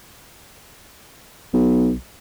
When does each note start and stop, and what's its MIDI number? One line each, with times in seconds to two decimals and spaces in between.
1.53 1.93 35